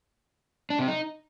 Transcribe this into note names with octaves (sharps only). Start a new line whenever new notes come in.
D4
C3
D#4